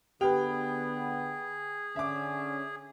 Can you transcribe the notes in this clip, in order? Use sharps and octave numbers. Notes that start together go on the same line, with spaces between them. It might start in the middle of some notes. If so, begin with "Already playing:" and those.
D3 B3 G4 G#4 B4 G5
D3 C#4 E5 D6